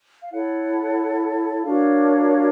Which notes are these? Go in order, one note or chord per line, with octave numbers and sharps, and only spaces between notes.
F5
E4 A4 C#5 F#5
D4 F#4 A#4 C#5 F5